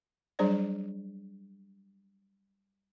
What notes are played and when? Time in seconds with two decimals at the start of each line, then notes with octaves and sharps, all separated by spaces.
0.39 F#3 G3 D4 G#4 C5 D5